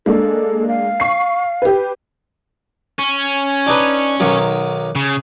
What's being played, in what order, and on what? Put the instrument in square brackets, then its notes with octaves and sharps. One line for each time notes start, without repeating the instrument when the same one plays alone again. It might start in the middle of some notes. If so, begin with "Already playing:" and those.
[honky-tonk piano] G#3 A#3 D4 [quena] A4
[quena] F5
[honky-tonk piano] C#6 C7
G4 B4
[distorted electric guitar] C#4
[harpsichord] D4 D#4 B4
B1 D#3 F#3
[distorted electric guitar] C#3